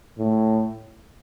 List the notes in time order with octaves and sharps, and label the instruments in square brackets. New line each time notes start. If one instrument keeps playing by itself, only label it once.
[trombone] A2